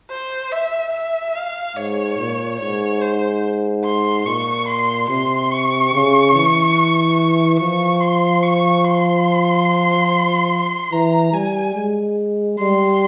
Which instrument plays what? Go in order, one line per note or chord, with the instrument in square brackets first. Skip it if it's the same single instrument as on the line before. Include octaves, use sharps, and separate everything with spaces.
[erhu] C5
E5
E5
F5
[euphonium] G#2 [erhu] C#5
[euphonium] A#2
[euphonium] G#2 [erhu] C#5
[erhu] C5
C6
[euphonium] A#2 [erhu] C#6
[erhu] C6
[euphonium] C3 [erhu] C6
[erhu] C#6
[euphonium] C#3
E3
[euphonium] F3 [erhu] C#6
[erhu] C6
C#6
C6
[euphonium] E3 [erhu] A#5
[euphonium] G3 [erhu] G#5
[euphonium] G#3
[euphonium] G3 [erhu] C6